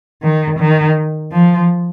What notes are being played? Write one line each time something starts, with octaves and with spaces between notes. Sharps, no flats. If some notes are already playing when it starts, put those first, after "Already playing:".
D#3
D#3
F3